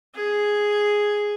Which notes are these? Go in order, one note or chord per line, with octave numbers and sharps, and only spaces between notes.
G#4